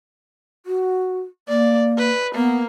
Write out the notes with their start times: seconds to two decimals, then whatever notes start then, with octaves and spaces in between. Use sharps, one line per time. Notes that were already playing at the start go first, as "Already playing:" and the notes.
0.66 F#4
1.48 A#3 D5
1.98 B4
2.35 A#3 B3